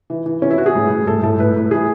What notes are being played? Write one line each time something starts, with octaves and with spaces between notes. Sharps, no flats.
E3
E3
E3 C#4
E4
E3 F#4
G#4
A2
A2
A2 A4
A2 A4
A2 B4
A2
E3 G#4